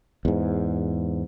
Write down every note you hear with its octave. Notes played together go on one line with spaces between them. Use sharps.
E2 G#2